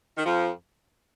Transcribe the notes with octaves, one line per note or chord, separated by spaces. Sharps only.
D#3
F2 F3